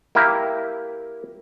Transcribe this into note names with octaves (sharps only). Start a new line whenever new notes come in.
A#3 E4 G4 A#4